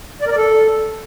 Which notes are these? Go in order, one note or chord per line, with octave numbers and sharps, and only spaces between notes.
D5
A#4
D5
A4